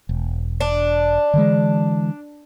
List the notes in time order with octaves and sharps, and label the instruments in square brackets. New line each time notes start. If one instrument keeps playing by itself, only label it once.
[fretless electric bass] E1
[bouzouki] D4
[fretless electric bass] D3 E3 G#3